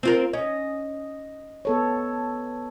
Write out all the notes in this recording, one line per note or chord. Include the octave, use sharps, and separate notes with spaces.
C4 F4 A#4
C#4 D#5
B3 A4 C#5